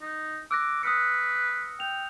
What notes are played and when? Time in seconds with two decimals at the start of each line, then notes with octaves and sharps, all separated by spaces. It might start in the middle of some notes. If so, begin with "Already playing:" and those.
0.02 D#4
0.51 D6 E6 F#6 A#6
0.83 B4 D#6 F6 C#7
1.80 G5 F7